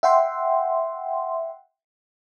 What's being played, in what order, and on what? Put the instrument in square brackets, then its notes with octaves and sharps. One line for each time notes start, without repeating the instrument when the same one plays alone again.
[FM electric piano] E5 F#5 G5 C6